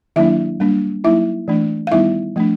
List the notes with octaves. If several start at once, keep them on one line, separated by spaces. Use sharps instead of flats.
D#3 F#3 A#3 D4 E4 E5
G3 A#3 D4
F#3 A#3 D#4 E4 E5
E3 A3 D4
F5
D#3 G3 B3 D#4 E4 E5
F3 A3 D4